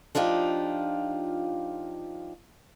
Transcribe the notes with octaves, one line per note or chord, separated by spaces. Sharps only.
F3 D4 D#4 F4 G4